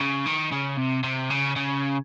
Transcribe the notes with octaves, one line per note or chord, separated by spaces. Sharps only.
C#3
D#3
C#3
C3
C3
C#3
C#3